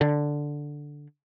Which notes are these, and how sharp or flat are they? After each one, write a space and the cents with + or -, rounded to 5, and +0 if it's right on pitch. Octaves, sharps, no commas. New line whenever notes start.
D3 +0